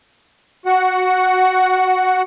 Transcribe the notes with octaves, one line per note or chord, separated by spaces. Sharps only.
F#4 F#5